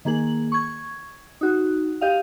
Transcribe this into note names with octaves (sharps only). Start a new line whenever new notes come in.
D#3 A#3 G#4 F#7
C#6 G#6
D#4 F#4
G4 D#5 F5